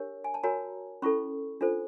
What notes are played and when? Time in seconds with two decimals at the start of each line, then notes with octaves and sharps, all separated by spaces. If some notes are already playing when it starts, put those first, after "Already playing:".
Already playing: D4 G4 A#4 C#5
0.24 G#5
0.34 A5
0.44 F#4 A#4 C#5 G#5 A#5
1.02 C#4 E4 A4 B5 C#6
1.61 D4 F4 A4 C5